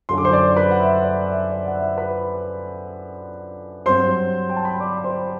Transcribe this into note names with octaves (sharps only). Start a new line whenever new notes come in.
F#2 D3 F#3 C6
D6
C5 C6
D5 D6
B4 B5
F#5
E5
D5
E5
D5
F#5
E5
B4 B5
G2 F#3 C4 C5 C6
G5
A5
B5
C6
D5 D6
B5
C5 C6